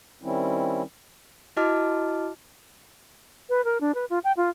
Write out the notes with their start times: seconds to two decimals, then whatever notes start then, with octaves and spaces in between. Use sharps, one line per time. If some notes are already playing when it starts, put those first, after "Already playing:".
0.22 D#3 G3 C4 C#4 E4
1.57 E4 F#4 D#5 A5 D6 F6
3.49 B4
3.65 A#4
3.81 D4
3.95 B4
4.10 F4
4.24 G5
4.37 F4